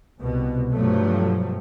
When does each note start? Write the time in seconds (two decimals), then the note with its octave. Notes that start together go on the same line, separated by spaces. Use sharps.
0.20 C2 B2
0.71 G2 B2 F3 F#3 A3